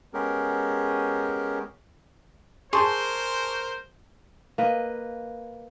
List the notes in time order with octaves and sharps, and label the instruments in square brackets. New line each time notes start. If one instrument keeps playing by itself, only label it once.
[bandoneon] G#3 B3 C#4 G4 G#4 A#4
[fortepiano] G#4 A5 [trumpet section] A#4 C5 [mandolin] C6 [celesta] C#6
[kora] A#3 B4 D#5